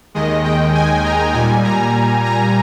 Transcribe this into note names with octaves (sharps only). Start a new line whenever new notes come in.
D#2 D#3 G#3 D#5
G5
G#5
A#5
A#2 G3 G#5
A#5
A#5